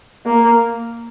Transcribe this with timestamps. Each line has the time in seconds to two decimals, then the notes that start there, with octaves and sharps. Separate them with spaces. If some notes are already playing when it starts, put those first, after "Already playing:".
0.25 A#3